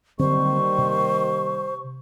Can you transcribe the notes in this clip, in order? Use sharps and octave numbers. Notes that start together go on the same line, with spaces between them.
D3 D#3 F#3 G3 A#3 C4 C5 C#6
C3